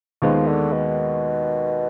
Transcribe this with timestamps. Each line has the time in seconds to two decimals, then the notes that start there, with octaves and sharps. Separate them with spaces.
0.22 D#2 D#3 F3 G#3 B3 D#4
0.47 D3
0.72 B2